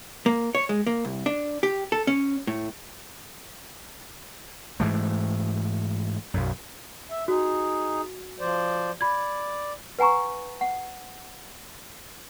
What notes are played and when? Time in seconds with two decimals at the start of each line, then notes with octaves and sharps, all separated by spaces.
0.26 A#3
0.55 C#5
0.69 G#3
0.87 A#3
1.05 C2
1.26 D4
1.63 G4
1.92 A4
2.07 C#4
2.47 A2
4.80 G#2 E3 A3
6.34 B1 F#2
7.11 E5
7.28 D#4 F#4 G#4
8.40 F3 C5 D5
9.01 D5 B5 G#6
9.99 B4 F#5 G#5 A#5 C#6
10.61 F#5